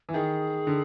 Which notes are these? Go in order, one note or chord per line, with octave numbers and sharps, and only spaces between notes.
E3
D#3 G#4
D3